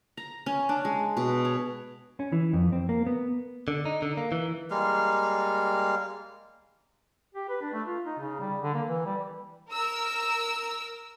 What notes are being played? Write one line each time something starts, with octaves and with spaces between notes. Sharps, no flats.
A#5
C#4
D4
G#3
B2
C#5
C#4
E3
F2
C4
A#3
B3
D3
D#4
D3
A#3
E3
G3 G#3 A#3 F5
G4
B4
D4
A3
F4
D#4
C#3
G3
D3
A#3
E3
G3
A#4 E6